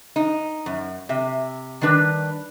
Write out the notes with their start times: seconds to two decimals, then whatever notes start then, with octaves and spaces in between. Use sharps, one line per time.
0.16 D#4
0.66 F#2
1.09 C3 E5
1.81 D#3 G3 D4 B4